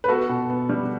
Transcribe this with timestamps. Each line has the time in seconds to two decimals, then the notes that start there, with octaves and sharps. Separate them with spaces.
0.04 B4
0.08 B3 F#4 A4
0.29 B2
0.50 B3
0.69 G3